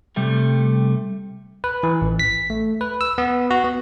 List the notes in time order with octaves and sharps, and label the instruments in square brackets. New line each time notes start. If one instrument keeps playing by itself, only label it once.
[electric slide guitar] C3 G3 A3
[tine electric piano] B4
E3
A1
B6
A3
B4
E6
B3
F#4
B3